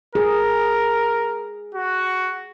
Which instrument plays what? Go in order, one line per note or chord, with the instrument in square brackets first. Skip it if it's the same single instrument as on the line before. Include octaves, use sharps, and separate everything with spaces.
[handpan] G#4 [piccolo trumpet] A#4
[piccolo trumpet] F#4